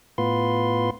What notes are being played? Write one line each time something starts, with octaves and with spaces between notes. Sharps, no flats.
A2 B3 F4 B4 C6